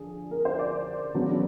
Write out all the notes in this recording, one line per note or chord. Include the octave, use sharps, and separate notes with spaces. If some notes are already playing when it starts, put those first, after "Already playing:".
Already playing: D3 F3 D4 G#4
A#4
C5
D5
C#3 F#3 B3 D4